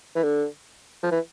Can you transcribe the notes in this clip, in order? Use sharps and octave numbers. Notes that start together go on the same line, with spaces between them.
E3
D3
F3
E3